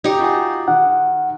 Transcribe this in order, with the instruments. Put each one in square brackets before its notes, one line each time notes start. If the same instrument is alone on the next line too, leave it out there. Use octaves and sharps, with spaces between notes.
[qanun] D#4 G4
[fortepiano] F4 F#4 G#5
[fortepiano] D#3 [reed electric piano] F#5